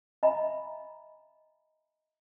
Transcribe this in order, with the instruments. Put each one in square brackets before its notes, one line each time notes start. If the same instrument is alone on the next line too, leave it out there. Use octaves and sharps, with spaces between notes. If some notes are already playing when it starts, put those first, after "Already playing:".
[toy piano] D#5 E5 G#5 A#5 B5